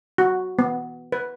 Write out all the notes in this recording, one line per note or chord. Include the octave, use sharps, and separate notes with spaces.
F#4
B3
B4